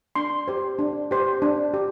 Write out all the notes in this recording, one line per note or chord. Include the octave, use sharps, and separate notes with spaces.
D4 C6
G4 C5
D4
G4 C5
D4
G4